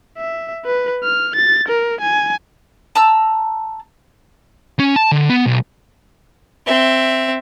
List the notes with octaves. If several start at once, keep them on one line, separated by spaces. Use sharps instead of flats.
E5
B4
F6
A6
A#4
G#5
A5 A#5 E6
C#4
A5
D3
B3
B1
C4 E5